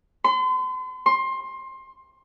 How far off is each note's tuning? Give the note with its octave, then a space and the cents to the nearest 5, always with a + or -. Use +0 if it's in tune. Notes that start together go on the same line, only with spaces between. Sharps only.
C6 -40
C6 +20